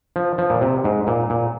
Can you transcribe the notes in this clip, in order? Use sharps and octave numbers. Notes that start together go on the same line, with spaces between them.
F3
F3
A#2
C3
G#2
A#2
A#2